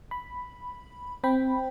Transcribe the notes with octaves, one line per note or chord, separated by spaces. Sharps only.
B5
C4 G5 B5